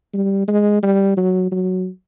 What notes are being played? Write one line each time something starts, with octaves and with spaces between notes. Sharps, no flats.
G3
G#3
G3
F#3
F#3